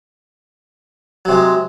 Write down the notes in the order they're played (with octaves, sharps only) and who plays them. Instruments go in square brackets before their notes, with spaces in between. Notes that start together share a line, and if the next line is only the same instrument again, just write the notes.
[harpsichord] F#3
C3
G#3